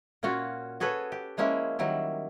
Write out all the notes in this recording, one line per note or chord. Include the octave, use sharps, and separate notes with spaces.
A#2 C#4 F4 F#4 C#5
F#4 G#4 A4 B4 C#5
G4
F3 G#3 A#3 C#4 E4 G#4
D#3 F#3 G3 E4